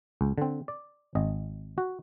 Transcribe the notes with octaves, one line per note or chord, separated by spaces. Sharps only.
C#2
D3 C4
D5
G#1 D#5
F#4